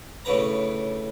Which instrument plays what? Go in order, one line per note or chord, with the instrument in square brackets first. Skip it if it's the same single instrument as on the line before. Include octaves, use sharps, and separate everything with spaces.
[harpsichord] A2 C#3 D4 B4 A#5